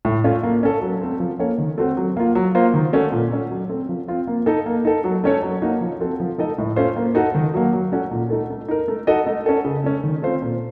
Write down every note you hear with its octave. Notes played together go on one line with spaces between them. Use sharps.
A2
A3 C#4 F4
A#3
C#4 A4
F#3
A3 C4
F3
A#3 C#4 A4 C#5
D#3
A3 C4 F#4 C5
F#3
A#3 F4
F#3
A#3 F4 C5
D#3
A3 C#4 F#4 A4
A#2
A3 C#4
F#3
A3 C4
F3
C4 F4
A#3
D#4 A4
A#3
D#4 A4
F#3
A3 C#4 A4 C#5
F#3
A#3 D#4 F#4
F3
C4 F#4 A4
F3
A3 D#4 A4 D#5
A2
A3 C#4 F4 C5
A#3
D#4 F#4 A4
D#3
F#3 A#3
F#3
A3 C#4 F#4
A#2
A3 D#4 A4
A3
D#4 A#4
A3
D#4 F#4 A4 D#5
A3
C#4 A4
C#3
A3 C#4
D#3
A3 C4 F4 C5
A#2